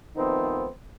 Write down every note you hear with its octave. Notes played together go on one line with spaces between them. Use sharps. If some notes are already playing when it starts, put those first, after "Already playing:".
D#3 F3 A3 B3 C4 D#4